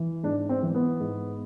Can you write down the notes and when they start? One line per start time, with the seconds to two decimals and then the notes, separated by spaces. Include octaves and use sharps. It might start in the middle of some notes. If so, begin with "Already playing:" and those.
Already playing: E3
0.23 G#2 D4
0.49 C4
0.63 E3
0.75 B3
1.00 G#2